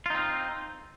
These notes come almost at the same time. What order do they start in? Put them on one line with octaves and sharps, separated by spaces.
F4 D#4 C4